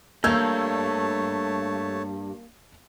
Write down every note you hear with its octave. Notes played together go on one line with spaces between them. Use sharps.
G2 A3 A#3 C#5 A5 E6 G6 G#6